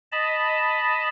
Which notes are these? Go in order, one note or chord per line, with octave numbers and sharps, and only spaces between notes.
D#5 A5 B5